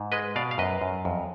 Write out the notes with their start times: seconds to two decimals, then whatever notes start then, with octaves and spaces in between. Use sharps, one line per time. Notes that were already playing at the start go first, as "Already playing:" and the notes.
Already playing: G#2
0.12 G#3 B4 D#5
0.36 B2 D5 F5
0.51 F5
0.58 F#2 B4 D#5
0.82 F#2
1.05 F2